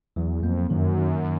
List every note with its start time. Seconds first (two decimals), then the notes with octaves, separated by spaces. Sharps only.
0.16 E2 F#3
0.42 F2 A#3
0.70 F#2 D#3
0.97 D#3